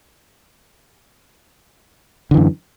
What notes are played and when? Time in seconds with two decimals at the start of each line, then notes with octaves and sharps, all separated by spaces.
2.31 D3
2.34 E3
2.37 F#2